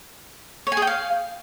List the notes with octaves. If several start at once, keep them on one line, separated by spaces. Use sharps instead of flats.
C#5
G#5
G#4
G5
F5